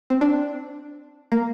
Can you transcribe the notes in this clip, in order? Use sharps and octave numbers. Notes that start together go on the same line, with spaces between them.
C4
D4
A#3